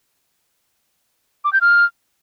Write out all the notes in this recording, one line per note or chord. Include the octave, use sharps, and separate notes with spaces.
D6
G6
F6